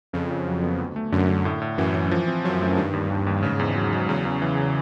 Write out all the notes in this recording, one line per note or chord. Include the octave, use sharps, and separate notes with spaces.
F2 C#3
C#3
F#3
B3
D2
A3
F#2 D3
D3
A2
A2
F#2 E3
E3
F3
C4
F#2 F4
A3
G2 D#3
D#2
D#2
D#2
G#2 C#3
E2
F#3
F#3
E2 C#3
E2
E3